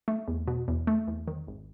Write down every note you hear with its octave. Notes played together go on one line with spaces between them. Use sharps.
A3
E2
B2
E2
A3
E2
D#3
G#1